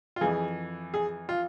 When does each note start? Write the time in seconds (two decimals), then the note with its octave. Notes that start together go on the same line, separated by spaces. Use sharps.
0.16 F4
0.21 F2 E3 G#4
0.94 G#4
1.29 F4